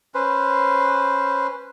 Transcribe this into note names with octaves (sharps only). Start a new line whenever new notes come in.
C#4 B4 C5